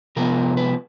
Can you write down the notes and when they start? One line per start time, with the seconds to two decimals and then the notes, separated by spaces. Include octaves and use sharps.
0.16 C3 F3 G#3 B3 A#4
0.57 B4